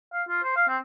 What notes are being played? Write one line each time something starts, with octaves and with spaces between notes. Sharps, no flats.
F5
F4
C5
F5
C4